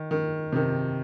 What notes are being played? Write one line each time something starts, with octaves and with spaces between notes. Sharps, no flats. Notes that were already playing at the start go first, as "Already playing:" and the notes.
Already playing: D#3
D#3
C3
D#3